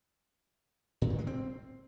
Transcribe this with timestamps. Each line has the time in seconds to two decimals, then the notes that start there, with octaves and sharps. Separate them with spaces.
1.02 A2
1.10 D#3
1.18 G#3
1.27 C4